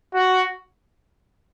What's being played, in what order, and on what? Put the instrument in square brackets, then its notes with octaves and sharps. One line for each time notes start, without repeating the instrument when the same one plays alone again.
[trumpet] F#4